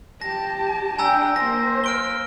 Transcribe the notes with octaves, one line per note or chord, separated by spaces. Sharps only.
G4 A5 A#6
D4 G5 G#5 A#5 E6
A#3 C5 A#6
F6 D7 G7